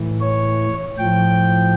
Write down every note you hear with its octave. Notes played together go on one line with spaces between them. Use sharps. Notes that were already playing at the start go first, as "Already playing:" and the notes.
Already playing: A2 E3
C#5
A2 F3 G5